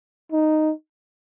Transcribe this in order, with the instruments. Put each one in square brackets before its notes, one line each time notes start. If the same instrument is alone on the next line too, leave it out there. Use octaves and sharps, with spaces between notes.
[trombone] D#4